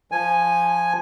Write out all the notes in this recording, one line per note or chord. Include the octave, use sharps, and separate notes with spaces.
F3 G#5